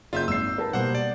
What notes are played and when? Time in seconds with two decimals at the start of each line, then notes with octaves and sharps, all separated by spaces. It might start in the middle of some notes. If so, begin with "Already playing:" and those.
0.13 F#1 F4 E5 G6
0.28 G#1 E6 C7
0.58 A#4 B4 A5
0.73 B2 G3 A#3 C5 F#5
0.95 D5